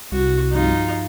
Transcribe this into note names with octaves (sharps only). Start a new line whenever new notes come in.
C2 F#4
G2 F3 D#4 F4